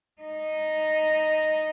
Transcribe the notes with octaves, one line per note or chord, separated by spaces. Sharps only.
D#4